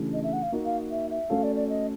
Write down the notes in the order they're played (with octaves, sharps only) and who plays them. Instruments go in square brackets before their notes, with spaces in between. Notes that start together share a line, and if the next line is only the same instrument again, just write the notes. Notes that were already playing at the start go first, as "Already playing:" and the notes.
Already playing: [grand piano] C#3 E3 A3 D4 G4
[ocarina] D#5
E5
F#5
F5
[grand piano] A#3 D#4 F#4 A#4
[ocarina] F5
E5
E5
[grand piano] A3 C#4 F#4 A4 [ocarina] F5
[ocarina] D5
D5
D#5